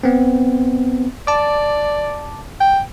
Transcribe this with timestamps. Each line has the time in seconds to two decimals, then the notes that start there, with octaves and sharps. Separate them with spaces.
0.03 B3 C4
1.27 D5 A5 D6
2.60 G5